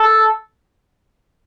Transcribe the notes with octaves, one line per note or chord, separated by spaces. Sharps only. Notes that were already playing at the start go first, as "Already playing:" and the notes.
Already playing: A4